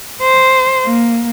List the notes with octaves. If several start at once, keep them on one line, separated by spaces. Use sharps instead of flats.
C5
A#3